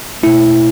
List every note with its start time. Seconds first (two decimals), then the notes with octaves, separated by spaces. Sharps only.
0.23 B2 A3 E4